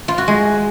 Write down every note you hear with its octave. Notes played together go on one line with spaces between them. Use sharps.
F4
F#4
G#3